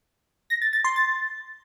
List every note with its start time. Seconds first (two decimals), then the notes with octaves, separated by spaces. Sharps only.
0.50 A#6
0.62 A6
0.73 A6
0.84 C6
0.96 A6